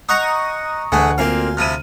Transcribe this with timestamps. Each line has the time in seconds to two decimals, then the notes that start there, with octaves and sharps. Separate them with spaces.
0.09 D#4 F#5 A#5 C#6 D#6
0.92 A1 D2 A3 G#4 F#5 G#5 C#6
1.18 A#3 C4 F4 F5 G#5 C6
1.57 C3 F3 E4 F6 D#7